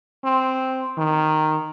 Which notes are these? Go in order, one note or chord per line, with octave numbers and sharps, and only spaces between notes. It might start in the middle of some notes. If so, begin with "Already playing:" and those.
C4
D#3